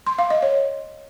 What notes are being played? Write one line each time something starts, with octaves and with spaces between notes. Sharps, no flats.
C6
F5
D#5
C#5